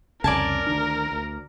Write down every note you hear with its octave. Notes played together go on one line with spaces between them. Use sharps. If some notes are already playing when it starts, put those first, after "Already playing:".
C2 F2 C#3 A#4 D5 G#5 A5
D2 D#3 D4
D2